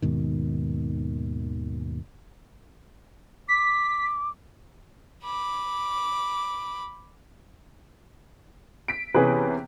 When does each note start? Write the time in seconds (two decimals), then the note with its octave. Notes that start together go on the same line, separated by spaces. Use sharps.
0.02 D#2 G#2 B2 D#3
3.48 D6 B6
5.24 B5 D6
8.88 B6 D7
9.15 C3 E3 B3 C#4 G#4 B4